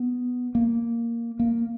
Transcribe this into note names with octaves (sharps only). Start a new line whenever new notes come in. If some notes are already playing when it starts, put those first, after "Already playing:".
Already playing: B3
A#3
A#3